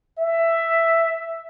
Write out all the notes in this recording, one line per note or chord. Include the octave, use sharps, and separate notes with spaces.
E5